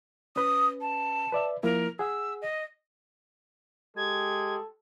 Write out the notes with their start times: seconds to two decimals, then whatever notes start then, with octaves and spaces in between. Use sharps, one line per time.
0.36 C#4 B4 D#6
0.81 A5
1.32 B4 D5 E5
1.63 F3 A#3 E4 A#4
1.99 G#4 F#5 E6
2.42 D#5
3.97 G#3 G4 A4 G#6